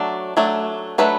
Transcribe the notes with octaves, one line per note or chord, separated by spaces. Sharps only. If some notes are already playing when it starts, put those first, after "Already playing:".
Already playing: F#3 A3 D4
F#3 A3 D4
F#3 A3 D4 B4